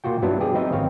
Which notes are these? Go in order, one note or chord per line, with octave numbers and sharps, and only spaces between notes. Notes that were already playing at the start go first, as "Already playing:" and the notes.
A#2 F4 F#4 G5
G2 F#3 B3 D4 E4
G3 G4 G#4
C4 D#4 B4 D#5 E5 G5
G#1 C4 C#5 F5